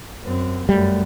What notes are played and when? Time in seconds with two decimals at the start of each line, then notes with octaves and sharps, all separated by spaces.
0.24 F#2 C4
0.69 F#2 G3 A3